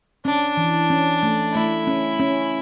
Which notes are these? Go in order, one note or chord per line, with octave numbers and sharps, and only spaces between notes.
C#4 D4
E3
C#4
A3
A3 E4
C#4
C#4